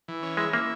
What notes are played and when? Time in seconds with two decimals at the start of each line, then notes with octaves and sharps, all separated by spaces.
0.08 E3
0.23 C#4
0.37 G#3 E4
0.53 A#3 E4